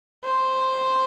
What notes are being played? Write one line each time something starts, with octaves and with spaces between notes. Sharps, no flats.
C5